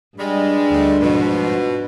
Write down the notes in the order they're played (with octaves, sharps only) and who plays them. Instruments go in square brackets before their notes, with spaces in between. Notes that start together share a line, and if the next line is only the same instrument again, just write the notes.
[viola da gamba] G2 [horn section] G3 G#3
[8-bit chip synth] D2 A3
[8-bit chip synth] G#2 F3 [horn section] B2